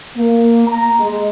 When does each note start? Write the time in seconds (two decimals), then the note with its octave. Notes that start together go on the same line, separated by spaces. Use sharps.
0.17 A#3
0.68 A#5
1.00 G#3